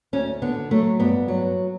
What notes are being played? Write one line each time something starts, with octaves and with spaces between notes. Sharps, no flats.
D2 C#4
D3 B3
F#3 A3
G2 B3
F#3